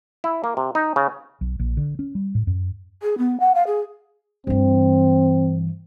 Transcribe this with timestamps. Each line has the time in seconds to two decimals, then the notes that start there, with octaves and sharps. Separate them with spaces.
0.24 E4
0.44 A#3
0.57 C3
0.75 D#4
0.96 C#3
1.41 B1
1.59 A#1
1.77 D3
1.99 C#4
2.15 G3
2.35 A2
2.47 F#2
3.02 G#4
3.18 B3
3.40 F#5
3.55 F5
3.67 G#4
4.47 G2 E3 C4